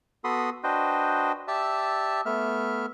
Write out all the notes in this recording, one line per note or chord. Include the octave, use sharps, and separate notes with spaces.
B3 F#4 A4 B5 C6 D#6
D4 F#4 B4 C5 D#5 G5
G4 D5 E5 A5 E6
A3 B3 E5 F6